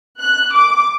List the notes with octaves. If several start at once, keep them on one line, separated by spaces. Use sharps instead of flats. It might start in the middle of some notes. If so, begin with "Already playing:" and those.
F#6
D6